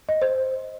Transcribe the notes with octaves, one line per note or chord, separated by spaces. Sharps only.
D#5
C5